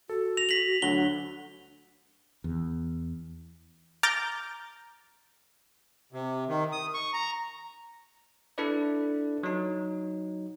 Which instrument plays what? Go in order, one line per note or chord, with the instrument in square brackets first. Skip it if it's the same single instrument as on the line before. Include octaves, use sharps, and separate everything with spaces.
[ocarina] F#4 [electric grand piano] A4
[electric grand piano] A#6 [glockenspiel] F7
[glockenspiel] B6 F7 F#7
[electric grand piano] D2 F#3 F#5 [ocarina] D4 [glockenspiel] G7
[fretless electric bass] E2
[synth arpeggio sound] A#5 D6 F6 G6 A6 A#6
[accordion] C3
D#3
D#6
C#6
A#5
[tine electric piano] D4 E4 A4 B4 D5
F#3 D#4